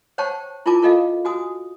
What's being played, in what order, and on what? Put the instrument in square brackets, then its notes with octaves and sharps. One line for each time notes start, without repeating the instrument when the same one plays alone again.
[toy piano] C5 C#5 F#5 G5 A5 C#6
E4 F4 A#4 G#5 A5 D6
F4 A4 D#5 F5
F#4 G#5 D#6